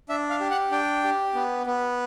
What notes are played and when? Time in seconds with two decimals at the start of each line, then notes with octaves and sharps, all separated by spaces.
0.09 D4 E5
0.30 F5
0.40 G4
0.51 F#5
0.71 D4 G5
1.04 G4
1.35 B3
1.66 B3